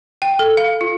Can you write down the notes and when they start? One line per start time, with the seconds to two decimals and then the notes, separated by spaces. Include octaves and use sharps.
0.22 G5
0.39 A4
0.57 F5
0.81 F4